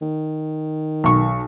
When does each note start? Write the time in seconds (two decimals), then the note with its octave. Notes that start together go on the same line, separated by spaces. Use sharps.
0.02 D#3
1.04 B1 C#6